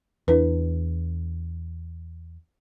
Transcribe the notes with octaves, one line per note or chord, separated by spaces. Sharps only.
E2 D4 E4 B4